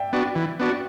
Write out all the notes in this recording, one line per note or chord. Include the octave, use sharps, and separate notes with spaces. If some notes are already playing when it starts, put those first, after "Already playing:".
Already playing: D5 E5 G5
B3 D4 F#4
E3
B3 D4 F#4